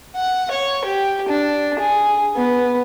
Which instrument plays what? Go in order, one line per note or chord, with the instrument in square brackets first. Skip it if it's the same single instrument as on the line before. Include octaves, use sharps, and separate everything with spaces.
[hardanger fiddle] F#5
C#5
G4
D4
G#4
B3